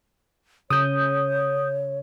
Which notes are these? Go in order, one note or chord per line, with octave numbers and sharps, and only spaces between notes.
C#3 C#5 D#6 G6